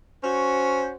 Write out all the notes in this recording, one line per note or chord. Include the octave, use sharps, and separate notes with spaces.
C#4 F#4 C5